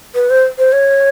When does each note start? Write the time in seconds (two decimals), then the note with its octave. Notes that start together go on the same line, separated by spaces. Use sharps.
0.15 B4
0.30 C5
0.58 C5
0.72 C#5